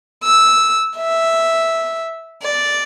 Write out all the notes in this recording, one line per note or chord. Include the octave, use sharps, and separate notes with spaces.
E6
E5
D5